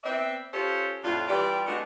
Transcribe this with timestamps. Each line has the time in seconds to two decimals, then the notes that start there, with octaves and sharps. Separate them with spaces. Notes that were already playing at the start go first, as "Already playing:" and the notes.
0.04 B3 C4 D5 E5
0.53 C#4 F4 G4 A4 C5 C#5
1.04 F2 A2 D4 F4
1.28 E3 G3 F4 G4 D5
1.66 G#3 A3 B3 D4 D#4 F#4